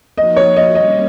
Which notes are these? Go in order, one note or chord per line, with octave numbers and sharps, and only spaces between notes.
F3 A#3 D#4 F#4 D#5
C#5
D#5
G3 A#3 C#4 D#5